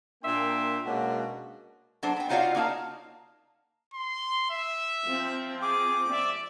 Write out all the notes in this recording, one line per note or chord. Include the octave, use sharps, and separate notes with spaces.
A#2 A#3 D4 E5 G5 C6
B2 G#3 A#3 C#4 D4 F#4
F#3 D4 A4 C5
B3 G5
D#4 F4 F#4 C#5 D5 F5
A#3 C#4 D#4 A#4 F5 A5
C6
E5
F3 C4
G#4 D6
D5 E5